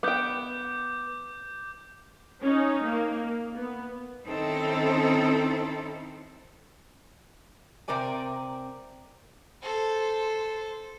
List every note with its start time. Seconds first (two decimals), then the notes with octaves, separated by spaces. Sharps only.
0.03 B3 G5 D6 G6
2.42 C#4 D#4
2.84 A#3
3.55 B3
4.28 D#3 C4 C#4 D#4 E4 A4
7.88 C3 C4 A#4 D5 G#5
9.62 A4 C5